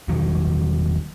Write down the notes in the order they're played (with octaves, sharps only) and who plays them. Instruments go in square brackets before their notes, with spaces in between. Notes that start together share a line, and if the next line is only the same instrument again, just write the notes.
[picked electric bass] E1 D#3 F#3